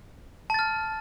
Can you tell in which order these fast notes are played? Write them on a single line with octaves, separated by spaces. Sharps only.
A5 A6 F6